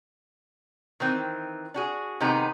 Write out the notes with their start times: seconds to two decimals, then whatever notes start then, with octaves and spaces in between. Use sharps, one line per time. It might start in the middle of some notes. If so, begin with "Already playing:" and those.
1.00 D#3 E3 C4
1.74 D4 F#4 G#4
2.20 C3 D#3 G#3 B3 D#4 G4